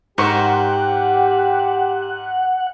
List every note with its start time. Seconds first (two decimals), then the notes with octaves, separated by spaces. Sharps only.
0.18 G#2 G4 A#4 C5 F#5 C#6